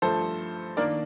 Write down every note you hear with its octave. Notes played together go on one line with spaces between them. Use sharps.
G2 F3 A3 A4 C5
D#3 A#3 D4 A#4 D5